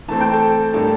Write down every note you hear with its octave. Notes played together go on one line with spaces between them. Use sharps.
E3 A3 C4 A5
G5
A4 A5
A2 G3 A#3 D4 A4 A5